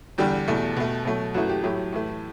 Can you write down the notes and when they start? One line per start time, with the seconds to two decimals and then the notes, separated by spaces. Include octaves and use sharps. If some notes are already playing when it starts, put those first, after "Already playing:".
0.18 E2 D3 G3 G4
0.48 E2 B2 A3
0.77 B2 A3
1.05 B2 F#3 A3
1.34 F#2 E3 A3 F#4
1.49 G4
1.64 A2 F#3 A3 G4
1.93 A2 E3 A3